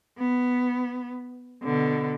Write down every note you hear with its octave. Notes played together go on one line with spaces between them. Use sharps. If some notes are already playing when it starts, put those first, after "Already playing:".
B3
B2 D3